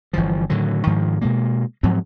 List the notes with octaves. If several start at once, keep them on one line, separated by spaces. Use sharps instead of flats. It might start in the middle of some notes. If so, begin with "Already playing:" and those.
G1 E3 F3
A2 D3 D#3 F#3
G#2 D#3 F3 G#3
B2 G#3 A#3
G#2 F3 F#3 C4